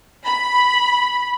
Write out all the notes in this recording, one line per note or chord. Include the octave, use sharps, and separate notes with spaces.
B5